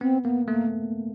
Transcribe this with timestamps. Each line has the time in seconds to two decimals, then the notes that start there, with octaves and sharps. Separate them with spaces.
0.01 B3 C4
0.25 A#3 B3
0.48 A3 A#3